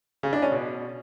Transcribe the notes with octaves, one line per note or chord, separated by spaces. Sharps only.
C#3
D4
C#4
B2